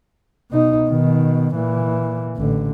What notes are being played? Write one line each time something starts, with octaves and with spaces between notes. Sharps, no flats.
B2 D#4
B2 D#3
A#2 E3
A1 D3